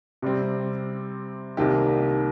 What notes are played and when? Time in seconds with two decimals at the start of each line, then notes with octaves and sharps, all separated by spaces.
0.22 C3 G3 C4
1.57 C2 C3 D#3 A#3 G4